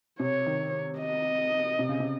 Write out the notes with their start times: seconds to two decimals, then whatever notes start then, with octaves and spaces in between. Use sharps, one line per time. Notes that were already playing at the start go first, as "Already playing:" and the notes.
0.20 C3 C#5
0.46 D#3
0.99 D#5
1.79 C3
1.89 C#3
2.00 C3